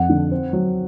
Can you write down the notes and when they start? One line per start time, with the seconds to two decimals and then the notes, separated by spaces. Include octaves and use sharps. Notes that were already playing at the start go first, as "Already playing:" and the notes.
Already playing: F2 F#5
0.09 D3
0.31 C4
0.53 F#3